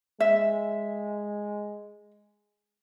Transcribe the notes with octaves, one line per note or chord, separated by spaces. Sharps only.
G#3 E5